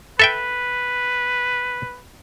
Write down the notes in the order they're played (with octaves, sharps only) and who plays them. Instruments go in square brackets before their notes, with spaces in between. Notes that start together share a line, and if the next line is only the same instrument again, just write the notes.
[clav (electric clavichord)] A4 E5 G5 [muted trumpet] B4